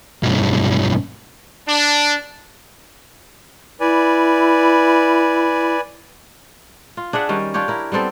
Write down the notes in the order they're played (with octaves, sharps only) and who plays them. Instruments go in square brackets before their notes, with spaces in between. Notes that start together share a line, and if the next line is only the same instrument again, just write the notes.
[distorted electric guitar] B1 G2
[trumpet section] D4
[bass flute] E4 [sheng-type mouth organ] B4 D5 G#5
[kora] F4
D4 G#4 E5 F#5
D#3 G3 C#4
D4 F4 G4 C#5
E4 A#4
G3 B3 C4 A4